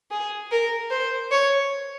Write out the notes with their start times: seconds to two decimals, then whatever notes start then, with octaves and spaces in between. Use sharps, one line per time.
0.11 G#4
0.51 A#4
0.91 C5
1.31 C#5